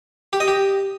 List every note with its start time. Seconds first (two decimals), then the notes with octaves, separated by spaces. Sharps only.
0.33 G4
0.40 D#5
0.48 G4